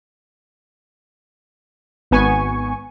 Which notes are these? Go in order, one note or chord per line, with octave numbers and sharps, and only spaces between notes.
G#1 B3 G#5 C#6